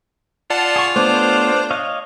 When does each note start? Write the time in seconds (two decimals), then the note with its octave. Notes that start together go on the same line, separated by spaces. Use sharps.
0.50 F4 D5 F#5 A5
0.76 G#4 C#6
0.96 A3 B3 D4 C5 C#5
1.70 C#5 D#5 F5